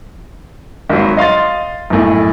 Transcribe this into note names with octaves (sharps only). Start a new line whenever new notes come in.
G#1 F#3
D#5 F5 C6 A6
B1 F#2 A2